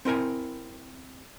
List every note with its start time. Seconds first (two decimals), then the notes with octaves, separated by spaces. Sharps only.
0.05 C4 E4 A#4 G#5